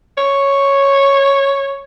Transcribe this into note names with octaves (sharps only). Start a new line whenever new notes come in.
C#5